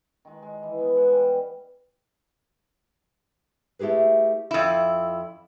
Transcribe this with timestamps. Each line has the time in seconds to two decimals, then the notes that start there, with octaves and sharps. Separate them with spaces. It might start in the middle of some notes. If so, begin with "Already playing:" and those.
0.25 D#3 G#3
0.42 G#3
0.63 E3
0.78 B3 G#5
0.96 G#3 F#5 G#5
1.12 G3
3.79 A3 E4 G4 G#4 B4
4.51 F2 E4